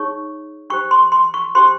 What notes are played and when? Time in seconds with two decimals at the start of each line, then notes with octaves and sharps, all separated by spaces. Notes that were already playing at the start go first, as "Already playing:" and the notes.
Already playing: D#4 G#4 C#5 C#6
0.70 D4 G4 C5 C#6
0.91 C6
1.12 C6
1.34 C#6
1.55 D4 G4 C5 C6